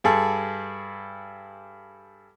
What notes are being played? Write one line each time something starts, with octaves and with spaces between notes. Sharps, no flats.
G2 G#4 A4